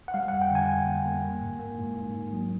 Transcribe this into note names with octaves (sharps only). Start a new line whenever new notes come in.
F#5
G3 F5
F2 F#5
G5
D3 G#5
G3
A#3
A#3
A#3
G#2
A#3
G#2
G#2
G#2
F#3